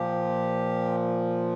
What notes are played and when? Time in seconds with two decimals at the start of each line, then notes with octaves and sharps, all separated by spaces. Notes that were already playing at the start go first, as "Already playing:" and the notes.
Already playing: A#2 F3 G4